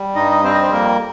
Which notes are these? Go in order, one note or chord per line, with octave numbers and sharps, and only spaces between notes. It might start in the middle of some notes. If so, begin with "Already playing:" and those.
Already playing: G3
G2 D#4 D#5
D#5
G3 C4 C5
D#5
C5
F2 A#3 A#4